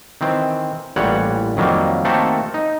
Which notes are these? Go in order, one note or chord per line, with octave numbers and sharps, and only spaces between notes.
D#3 E3 C4
A1 A#2 E3 G3 C#5 F#5
F2 D#3 F#3 G3 A#3
D#3 A3 A#3 C4 F#4 A4
D#4